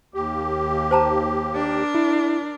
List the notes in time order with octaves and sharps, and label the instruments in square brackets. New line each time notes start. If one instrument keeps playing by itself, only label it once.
[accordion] D#2 G4
[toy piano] C5 A5 A#5
[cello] D4 A#4
[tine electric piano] E4